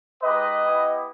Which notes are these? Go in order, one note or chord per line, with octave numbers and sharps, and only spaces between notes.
G#3 D#4 G4 B4 D#5
B3 E4 G4